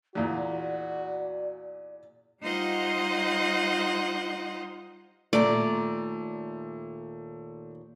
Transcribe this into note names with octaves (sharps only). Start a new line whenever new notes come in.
E2 A#2 F#4 D5
G3 D#4 F4 C5 D#5 F#5
D#2 A#2 A3 D5 A#5